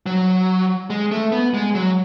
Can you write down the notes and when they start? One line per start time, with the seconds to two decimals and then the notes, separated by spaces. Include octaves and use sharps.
0.06 F#3
0.90 G#3
1.11 A3
1.32 B3
1.54 G#3
1.75 F#3